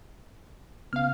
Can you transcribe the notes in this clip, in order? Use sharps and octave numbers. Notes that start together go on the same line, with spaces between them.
C#3 B3 F5 F6